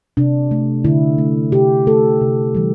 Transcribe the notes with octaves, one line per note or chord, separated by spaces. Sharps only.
C3 D4
A3
D3 E4
A3
C3 G4
A3 A4
C3
E3 G3